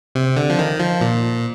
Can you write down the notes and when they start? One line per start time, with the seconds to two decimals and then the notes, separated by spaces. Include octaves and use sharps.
0.15 C3
0.37 D3
0.50 F3
0.59 D#3
0.79 F3
1.01 A#2